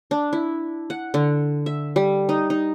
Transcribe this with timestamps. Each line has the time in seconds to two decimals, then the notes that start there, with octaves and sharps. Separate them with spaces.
0.11 D4
0.33 E4
0.90 F#5
1.14 D3
1.66 E5
1.96 G3
2.29 D#4
2.50 D#4